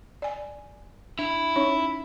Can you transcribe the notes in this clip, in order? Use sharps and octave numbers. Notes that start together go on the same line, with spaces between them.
D5 G#5
D4 E4
C#4 D#4 C#5